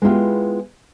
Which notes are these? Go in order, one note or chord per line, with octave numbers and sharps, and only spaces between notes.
G#3 B3 E4 F4 G4